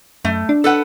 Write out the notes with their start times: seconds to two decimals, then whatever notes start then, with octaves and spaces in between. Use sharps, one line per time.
0.25 F#2 A3
0.49 D4
0.64 A4 B4 F#5